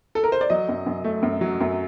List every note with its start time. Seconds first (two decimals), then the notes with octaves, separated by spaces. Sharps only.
0.15 A4
0.24 A#4
0.32 C5
0.41 D5
0.50 F#3 D#5
0.69 F#2
0.86 F#2
1.04 A3
1.23 F#2
1.41 F#3
1.61 F#2